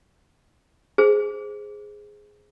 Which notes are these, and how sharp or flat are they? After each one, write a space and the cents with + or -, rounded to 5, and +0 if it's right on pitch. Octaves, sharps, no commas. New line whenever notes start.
G#4 +0 C5 +0